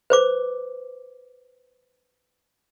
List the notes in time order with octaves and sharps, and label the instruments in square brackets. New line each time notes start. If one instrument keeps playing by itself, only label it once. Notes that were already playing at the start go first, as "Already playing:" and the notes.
[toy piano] B4 C5 D6